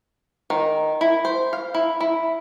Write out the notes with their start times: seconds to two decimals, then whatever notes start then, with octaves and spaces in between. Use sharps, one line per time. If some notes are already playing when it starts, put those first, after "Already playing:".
0.50 D#3
1.01 E4
1.25 C5
1.53 F5
1.75 E4
2.01 E4